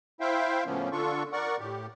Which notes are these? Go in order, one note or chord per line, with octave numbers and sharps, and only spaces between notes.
E4 C5 E5 F5 G5
A2 C#3 F3 A#3 B3 C#4
D3 D4 F4 A4 C#6
A#4 D5 F#5 C#6
A2 G4